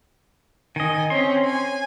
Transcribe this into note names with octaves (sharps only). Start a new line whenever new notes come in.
D#3 D#5 G#5
C4 C#4 C6
G#5